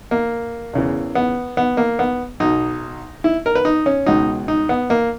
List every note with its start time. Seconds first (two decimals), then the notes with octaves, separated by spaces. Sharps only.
0.11 A#3
0.73 E2 C#3 E3
1.15 B3
1.57 B3
1.77 A#3
1.99 B3
2.40 B1 B2 D#4
3.24 E4
3.46 A#4
3.55 B4
3.65 D#4
3.86 C#4
4.06 C#2 B2 D#4
4.48 D#4
4.69 B3
4.90 A#3